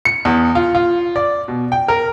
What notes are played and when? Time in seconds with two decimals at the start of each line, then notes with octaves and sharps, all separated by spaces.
0.05 C#7
0.25 E2
0.55 F4
0.75 F4
1.16 D5
1.48 B2
1.72 G5
1.88 A#4